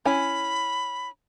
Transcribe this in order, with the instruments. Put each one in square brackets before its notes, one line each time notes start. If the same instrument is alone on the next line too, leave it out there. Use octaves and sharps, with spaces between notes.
[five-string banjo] C#4 E4 G#5 [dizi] B5